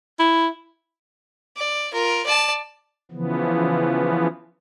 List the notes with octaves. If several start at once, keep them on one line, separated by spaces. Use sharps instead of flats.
E4
D5
F4 A#4
D5 A5
C#3 E3 F3 B3